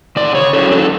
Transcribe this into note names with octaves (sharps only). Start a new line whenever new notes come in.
C#3 D5
C#5
F#3 C#4 A4
A4